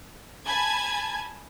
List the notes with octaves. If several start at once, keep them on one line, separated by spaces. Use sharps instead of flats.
G#5 A5 B5 G#6